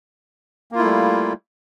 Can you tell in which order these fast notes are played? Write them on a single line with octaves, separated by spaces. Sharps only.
A#3 F4 E4 A3 G3